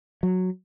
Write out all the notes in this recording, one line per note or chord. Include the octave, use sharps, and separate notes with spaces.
F#3